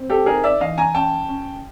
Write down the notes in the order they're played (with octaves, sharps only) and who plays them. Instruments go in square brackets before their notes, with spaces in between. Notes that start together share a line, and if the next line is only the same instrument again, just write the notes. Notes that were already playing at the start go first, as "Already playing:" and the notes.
Already playing: [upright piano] C4
G4 A4
D#4 G#4 A#4
D5 E5
E3 D#5 F5
G#5 A#5
C#4 G5 A5
C#4